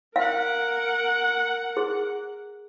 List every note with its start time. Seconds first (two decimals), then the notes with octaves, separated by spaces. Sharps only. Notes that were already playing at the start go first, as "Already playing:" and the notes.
0.16 A#4 F5 F#5
1.77 G#4